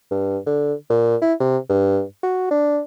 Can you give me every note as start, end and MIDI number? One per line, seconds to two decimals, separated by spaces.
0.11 0.38 43
0.46 0.73 50
0.90 1.16 46
1.22 1.33 64
1.40 1.58 48
1.69 2.02 43
2.23 2.46 66
2.51 2.80 62